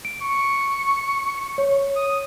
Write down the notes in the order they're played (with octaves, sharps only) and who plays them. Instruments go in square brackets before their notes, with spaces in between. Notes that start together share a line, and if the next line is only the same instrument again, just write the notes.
[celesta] D7
[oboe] C#6
[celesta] C#5
[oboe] D#6